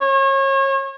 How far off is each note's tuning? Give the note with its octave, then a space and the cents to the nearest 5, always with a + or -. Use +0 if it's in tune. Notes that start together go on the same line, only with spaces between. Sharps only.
C#5 -35